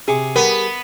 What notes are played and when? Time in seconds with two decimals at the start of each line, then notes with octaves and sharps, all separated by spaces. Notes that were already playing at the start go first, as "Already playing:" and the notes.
0.08 C3 G#4 C#6 D6
0.36 G3 B3 G4 A#4